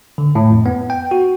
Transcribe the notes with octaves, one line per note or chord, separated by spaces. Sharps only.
D3
A2
F2
B3
G5
F#4